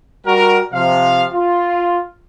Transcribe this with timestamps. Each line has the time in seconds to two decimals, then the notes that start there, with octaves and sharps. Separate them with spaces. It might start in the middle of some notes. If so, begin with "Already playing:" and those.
0.26 G3 F#4 A#4
0.73 C3 F3 F5
1.33 F4